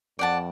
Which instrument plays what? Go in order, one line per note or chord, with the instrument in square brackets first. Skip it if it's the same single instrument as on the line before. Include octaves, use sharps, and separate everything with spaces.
[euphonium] F2 [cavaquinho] D5 F#5 A5